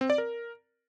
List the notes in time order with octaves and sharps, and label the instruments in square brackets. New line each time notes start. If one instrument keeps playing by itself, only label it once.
[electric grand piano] C4
D5
A#4